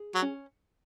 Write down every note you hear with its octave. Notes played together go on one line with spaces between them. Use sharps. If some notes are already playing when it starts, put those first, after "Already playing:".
Already playing: G#4
F#3
C#4